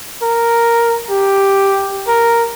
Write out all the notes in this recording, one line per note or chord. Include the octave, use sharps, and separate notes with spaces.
A#4
G4
A#4